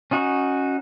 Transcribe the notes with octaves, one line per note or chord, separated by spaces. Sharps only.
C#4 D#4 F#4